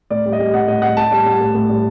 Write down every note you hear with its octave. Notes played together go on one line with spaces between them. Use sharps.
A2 D5
G3
D#5
G3
A2 F#5
A2 D#5
G3 F#5
A2 A5
G3
G3
A2
A2
G3